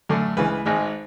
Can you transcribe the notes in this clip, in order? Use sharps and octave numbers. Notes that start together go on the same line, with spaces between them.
F#2 D3 A3
C#2 C#3 E3 B4
G#1 G#2 G#3